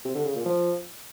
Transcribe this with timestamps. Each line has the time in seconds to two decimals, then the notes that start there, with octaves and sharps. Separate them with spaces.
0.05 C3
0.15 D3
0.25 C#3
0.35 A#2
0.45 F3